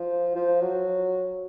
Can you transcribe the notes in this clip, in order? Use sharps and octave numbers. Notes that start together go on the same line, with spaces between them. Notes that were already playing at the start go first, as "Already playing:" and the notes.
Already playing: F3
F3
F#3